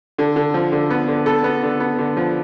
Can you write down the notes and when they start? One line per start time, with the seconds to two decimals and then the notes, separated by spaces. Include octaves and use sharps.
0.18 D3
0.36 D3
0.54 F3
0.72 D3
0.90 B3
1.08 D3
1.26 B3 A4
1.44 B3
1.63 D3
1.80 B3
1.99 D3
2.17 F3